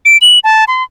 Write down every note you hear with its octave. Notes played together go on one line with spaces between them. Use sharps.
D7
F#7
A5
C6